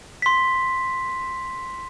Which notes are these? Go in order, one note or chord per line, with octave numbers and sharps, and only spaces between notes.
C6 B6